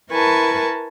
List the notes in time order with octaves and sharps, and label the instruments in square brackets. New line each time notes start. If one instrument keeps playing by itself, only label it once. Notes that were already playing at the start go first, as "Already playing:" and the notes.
[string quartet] E4 A#4 B4 G#5 A5 C#6